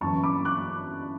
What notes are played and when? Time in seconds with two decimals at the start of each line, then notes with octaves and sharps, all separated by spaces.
0.01 G1 F#2 E3 A5 C#6
0.23 B5 D6
0.45 D6 F#6